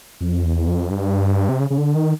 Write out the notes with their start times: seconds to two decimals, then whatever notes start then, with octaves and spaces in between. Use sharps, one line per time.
0.21 F2
0.44 E2
0.67 F2
0.91 G2
1.49 C3
1.60 C#3
1.70 C#3
1.78 D3
1.95 D#3